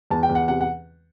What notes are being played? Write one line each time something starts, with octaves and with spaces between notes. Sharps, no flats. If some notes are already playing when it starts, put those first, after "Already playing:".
E2 A5
G5
E2
F#5
C3 F#5
F#5